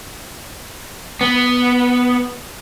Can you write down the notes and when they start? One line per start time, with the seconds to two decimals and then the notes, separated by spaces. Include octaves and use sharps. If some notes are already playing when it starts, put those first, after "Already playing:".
1.21 B3